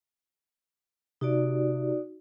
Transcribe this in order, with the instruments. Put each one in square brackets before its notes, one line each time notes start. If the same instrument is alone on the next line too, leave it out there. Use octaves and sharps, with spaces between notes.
[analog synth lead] C3 [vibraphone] D#4 F#4 D5